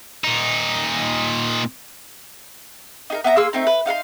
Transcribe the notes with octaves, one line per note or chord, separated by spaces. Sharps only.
A#2 D#4
D#4 G#4 A#4
B3 E5 A5 A#5
A#3 G#4 C6 E6
A3 C4 D#4
B4
D#4 F5 F#5 C6